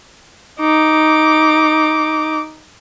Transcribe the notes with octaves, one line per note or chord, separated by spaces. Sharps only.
D#4 D6